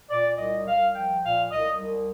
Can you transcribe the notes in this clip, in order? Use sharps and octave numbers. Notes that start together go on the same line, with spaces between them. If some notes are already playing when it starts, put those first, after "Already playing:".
A#2 D5
C2 D#5
C2 F5
F3 G5
A#2 F5
C2 D#5
C2